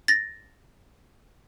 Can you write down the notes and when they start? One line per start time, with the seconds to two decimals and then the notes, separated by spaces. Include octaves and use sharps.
0.08 A6 A#6